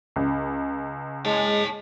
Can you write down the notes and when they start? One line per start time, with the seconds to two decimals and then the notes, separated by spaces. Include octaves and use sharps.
0.16 C#2
1.25 G#3 C#5 A5